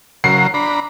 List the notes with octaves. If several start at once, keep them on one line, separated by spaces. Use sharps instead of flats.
C#3 F#3 A#4 C7
D4 A#5 B5